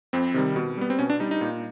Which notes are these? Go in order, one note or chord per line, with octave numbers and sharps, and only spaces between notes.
F2 C4
C3 D#3 G3
B2
G3 B3
C4
B2 C#4
D4
G3 D#4
D#4
A#2